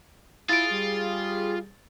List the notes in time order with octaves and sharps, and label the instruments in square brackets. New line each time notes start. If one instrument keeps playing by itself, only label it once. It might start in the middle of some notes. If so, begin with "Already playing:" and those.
[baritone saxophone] E4 [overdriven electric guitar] F4 [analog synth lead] G#4 [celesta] A6 D7
[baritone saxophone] G3